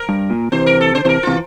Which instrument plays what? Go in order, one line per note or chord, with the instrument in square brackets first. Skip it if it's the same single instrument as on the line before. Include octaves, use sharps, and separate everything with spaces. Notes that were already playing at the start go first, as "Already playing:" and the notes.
Already playing: [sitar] A#4
[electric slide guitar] G2
A#2
[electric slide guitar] C3 E3 [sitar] C5
[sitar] A#4
A4
[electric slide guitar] D3 [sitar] C5
[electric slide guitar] C3 E3 [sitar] A#4 C5
[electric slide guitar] C3 E3 [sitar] F4